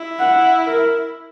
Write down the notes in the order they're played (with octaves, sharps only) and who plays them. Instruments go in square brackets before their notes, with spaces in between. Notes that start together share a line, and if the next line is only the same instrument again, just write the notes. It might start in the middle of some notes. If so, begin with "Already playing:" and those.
Already playing: [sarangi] E4
[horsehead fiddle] F#5
A#4